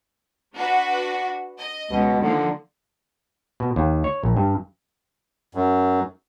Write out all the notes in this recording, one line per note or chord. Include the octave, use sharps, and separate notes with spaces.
D4 F#4 B4
D#5
C#2 B2
D3 D#3 F3 A#3
B2
D#2
C#5
A#1
G2
F#2